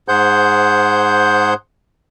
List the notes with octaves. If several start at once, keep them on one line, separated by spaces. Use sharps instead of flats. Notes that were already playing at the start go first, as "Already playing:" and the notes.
G#2 G#4 C5 F#5 G6